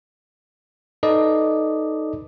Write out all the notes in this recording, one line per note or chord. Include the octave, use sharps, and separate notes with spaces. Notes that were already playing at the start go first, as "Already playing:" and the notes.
D#4 A4 B4 D5 D#5